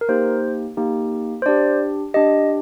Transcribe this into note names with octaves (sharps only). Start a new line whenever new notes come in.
A#4
A#3 D#4 G4 C5
A#3 D#4 G4
C5
D4 G4 D5
D4 G4 D#5